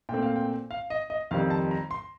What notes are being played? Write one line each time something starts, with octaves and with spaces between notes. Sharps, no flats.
A#2 A3 C4 G5
F5
G5
F5
D#5
D#5
F2 D#3 G3 C4 F5
A5
A#5
C6